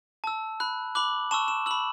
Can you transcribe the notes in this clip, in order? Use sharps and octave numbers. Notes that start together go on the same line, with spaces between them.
A5 E6
B5 F#6
B5 D6 F#6 F#7
A5 C#6 E6 E7
E7
B5 E6 F#7